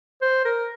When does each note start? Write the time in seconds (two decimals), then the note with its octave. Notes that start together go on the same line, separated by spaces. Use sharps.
0.22 C5
0.45 A#4